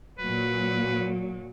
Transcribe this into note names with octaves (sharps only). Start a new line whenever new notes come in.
A#2 F#3 B4